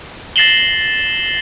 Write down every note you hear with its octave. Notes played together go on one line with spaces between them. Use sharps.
A6 A#6 C7 E7 F#7 G7